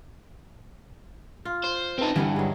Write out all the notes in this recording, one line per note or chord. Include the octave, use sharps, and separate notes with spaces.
F4
C5
C4 D#4 B4 A5
G2 D3 E3 G3 B3
F#3 G#3